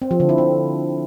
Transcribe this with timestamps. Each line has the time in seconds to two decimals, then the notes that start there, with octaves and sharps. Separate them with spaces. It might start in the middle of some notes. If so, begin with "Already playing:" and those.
0.02 C4
0.11 F3
0.20 D3
0.29 E4
0.38 C4